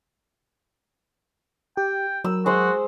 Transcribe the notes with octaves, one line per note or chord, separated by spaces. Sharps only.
G4 G5
F#3 A#4 E6
G#3 F#4 C5 C6